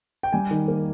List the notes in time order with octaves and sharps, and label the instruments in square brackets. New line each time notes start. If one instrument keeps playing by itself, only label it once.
[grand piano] G5
G3 G#5
D#3
A#3